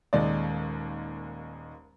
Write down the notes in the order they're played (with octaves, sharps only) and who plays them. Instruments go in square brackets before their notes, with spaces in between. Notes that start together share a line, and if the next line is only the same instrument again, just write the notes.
[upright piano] D#1 D#2 G#3 D5